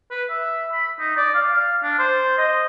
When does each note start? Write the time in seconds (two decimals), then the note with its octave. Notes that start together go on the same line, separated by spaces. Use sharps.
0.11 B4
0.30 E5
0.72 B5
0.99 D#4
1.17 D5
1.35 F5
1.53 F5
1.83 D4
1.99 C5
2.38 D#5